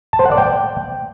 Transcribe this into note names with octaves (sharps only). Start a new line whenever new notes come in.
A5
C5
F#5
D5
G5